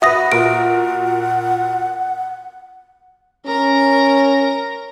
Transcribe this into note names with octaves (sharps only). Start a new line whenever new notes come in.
F#4 B4 E5 F#5 D#6 A#6
A#2 F#4 A#4 D7
C#4 A#4 A#5